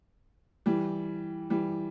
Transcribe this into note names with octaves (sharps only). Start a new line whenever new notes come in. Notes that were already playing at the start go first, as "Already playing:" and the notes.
E3 G3
E3 G3